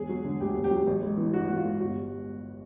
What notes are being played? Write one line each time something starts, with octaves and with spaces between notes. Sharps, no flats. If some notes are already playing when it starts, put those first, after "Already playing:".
Already playing: E1 G#4
F#3
D3
D2 G4
E1
G4
F#3
A1
G#3
E3
G2 F#4
A1 F#4
F4
G#3
G1 F#4
G3